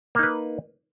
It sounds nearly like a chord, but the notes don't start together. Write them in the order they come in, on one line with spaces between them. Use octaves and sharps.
A#3 D#4 B4